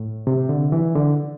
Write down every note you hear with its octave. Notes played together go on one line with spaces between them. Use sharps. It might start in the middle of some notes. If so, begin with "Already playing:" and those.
Already playing: A2
C3
D3
E3
D3